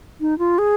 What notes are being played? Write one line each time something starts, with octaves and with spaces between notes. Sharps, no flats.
D#4
F4
G#4